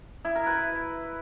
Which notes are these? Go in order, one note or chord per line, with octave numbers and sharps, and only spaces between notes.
E4
A#4
B4